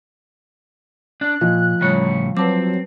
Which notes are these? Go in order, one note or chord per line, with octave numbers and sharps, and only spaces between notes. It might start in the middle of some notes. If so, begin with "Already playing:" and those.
D4 F#6
A#2 F3 D#5
A2 C#3 G3 C#5
F#3 C4 B4 A5 D6